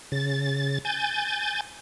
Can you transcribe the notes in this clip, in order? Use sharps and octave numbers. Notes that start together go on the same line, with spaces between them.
C#3 A6
G#5 G6 A6